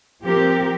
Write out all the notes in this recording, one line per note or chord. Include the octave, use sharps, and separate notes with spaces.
F3 C4 G4 A#4